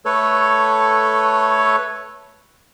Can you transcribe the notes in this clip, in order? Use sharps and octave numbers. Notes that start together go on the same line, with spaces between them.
A3 A4 B4 C#5